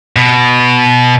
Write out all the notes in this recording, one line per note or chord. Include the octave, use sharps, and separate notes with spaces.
B2